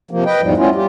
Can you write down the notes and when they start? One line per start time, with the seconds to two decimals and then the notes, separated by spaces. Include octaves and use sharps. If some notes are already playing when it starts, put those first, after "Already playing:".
0.11 C3 F3 A#3
0.26 B4 D#5 G5
0.41 E2 G#2 F3 G3
0.57 G3 A3 B3 C#4 E4 F4
0.75 G3 F4 G4